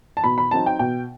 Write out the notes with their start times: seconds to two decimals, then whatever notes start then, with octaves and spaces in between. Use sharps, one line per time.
0.17 A5
0.24 B2 B5
0.38 B5
0.51 F#3 C4 D#4 A5
0.66 G5
0.79 B2 G5